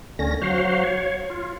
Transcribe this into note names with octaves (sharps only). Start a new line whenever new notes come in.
D2 D3 C#4 A#6
F#3 F#4 C5 F5
C#5
F4